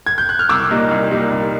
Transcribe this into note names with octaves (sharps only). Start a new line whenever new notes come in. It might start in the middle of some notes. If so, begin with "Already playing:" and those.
G#6
G6
F#6
F6
C2 D6 E6
A#2 G3 A#3 D#4
C2
A#2 G3 A#3 D#4
C2